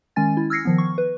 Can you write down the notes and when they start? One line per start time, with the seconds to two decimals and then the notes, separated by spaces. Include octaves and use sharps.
0.16 D#3 G#3 C#4 G#5 A6
0.37 E4
0.50 E6 F6 G#6 A#6 C7 C#7
0.65 D#3 F3 B3
0.78 C#6
0.98 B4